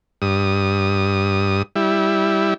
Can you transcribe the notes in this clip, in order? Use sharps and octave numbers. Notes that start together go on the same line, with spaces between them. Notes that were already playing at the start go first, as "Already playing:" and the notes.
G2 D#6
G3 E4